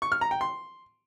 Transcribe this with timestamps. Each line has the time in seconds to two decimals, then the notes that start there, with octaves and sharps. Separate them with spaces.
0.02 C#6
0.12 F6
0.21 A#5
0.31 G5
0.41 C6